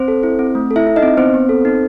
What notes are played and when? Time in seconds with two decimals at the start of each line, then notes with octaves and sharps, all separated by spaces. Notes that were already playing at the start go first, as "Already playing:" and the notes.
Already playing: C4 C5
0.08 A4
0.23 E4
0.39 C4
0.55 A3
0.71 A4
0.76 E4 E5
0.87 E4
0.96 D#4 D#5
1.02 C4
1.17 B3 C4 C5
1.34 B3
1.49 A4
1.65 D#4